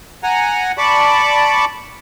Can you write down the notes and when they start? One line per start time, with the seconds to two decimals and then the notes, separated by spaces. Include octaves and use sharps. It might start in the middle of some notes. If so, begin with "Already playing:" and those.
0.23 F#5 G#5 A#5
0.78 D5 A5 B5 C#6 D6